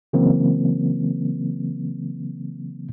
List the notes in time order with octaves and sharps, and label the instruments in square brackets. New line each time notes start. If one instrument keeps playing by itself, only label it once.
[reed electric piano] C#3 E3 F#3 A#3 C4